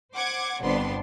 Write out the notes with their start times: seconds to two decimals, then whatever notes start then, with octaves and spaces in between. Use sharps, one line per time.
0.14 C5 F#5 D6 G#6
0.60 G1 F2 B3 D4 C6